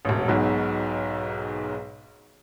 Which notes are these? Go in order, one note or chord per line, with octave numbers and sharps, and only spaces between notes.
E1 A1
B1 G#2 B2 F#3